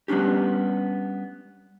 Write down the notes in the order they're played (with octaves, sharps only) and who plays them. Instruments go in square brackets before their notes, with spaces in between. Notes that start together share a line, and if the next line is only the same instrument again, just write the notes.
[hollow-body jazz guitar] G3 B3 C#4 D4 G4